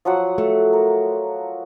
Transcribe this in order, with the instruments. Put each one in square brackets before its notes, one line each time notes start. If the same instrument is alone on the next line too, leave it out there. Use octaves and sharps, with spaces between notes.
[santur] F3 F#3 F#5
[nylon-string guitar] A3
[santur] A#4